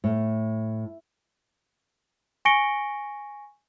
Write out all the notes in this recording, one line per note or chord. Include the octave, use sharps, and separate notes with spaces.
A2
G#5 C#6 A#6 C#7 D7 G7